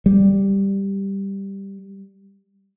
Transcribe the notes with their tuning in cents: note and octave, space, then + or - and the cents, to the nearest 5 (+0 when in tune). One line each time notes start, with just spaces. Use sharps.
G3 +5